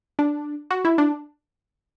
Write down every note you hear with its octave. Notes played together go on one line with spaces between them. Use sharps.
D4
F#4
E4
D4